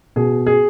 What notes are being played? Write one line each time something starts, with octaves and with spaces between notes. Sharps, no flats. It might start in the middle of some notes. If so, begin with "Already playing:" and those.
B2 G#4
G#4